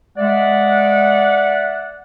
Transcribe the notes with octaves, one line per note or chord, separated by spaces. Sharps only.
G#3 D5 E5 F#5